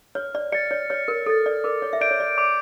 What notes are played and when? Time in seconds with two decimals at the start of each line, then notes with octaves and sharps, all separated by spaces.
0.15 C#5 F6
0.35 D5
0.52 D5 A6 C#7
0.71 C#5
0.90 C#5 F6
1.08 A#4
1.26 A4 A6 C#7
1.46 D5
1.64 A#4 D6
1.82 C#5
1.93 E5
2.01 D5 G6 D7
2.11 C#5
2.20 D5
2.38 D6